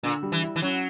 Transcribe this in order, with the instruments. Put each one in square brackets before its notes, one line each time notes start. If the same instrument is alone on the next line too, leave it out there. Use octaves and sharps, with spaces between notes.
[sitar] A#2 [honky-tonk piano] D3
[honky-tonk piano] G3
[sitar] E3
[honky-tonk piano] E4
[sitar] E3
[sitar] F#3 [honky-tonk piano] C#4